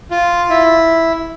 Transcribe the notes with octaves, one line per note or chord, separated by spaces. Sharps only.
F4
E4